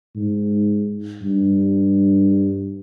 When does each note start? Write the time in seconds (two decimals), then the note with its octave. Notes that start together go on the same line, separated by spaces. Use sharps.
0.16 G#2
1.22 G2